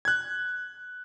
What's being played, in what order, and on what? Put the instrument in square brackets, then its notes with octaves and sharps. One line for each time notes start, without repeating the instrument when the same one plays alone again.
[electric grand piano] F#6 G#6